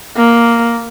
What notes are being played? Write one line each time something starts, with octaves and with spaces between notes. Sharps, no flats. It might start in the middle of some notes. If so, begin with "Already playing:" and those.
A#3